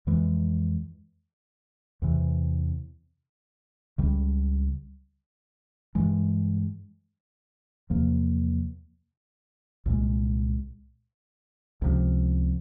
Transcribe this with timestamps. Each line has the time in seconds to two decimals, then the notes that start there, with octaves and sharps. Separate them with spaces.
0.07 F2 E3 G#3
2.02 E2 C3 E3
3.98 C#2 C#3 G3
5.95 G2 E3 G#3
7.90 E2 C3 F3 A#3
9.86 C2 A#2 G#3
11.82 C#2 C3 F3